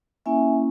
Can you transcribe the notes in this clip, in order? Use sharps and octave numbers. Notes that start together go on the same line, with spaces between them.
A#3 C#4 E4 E5 G#5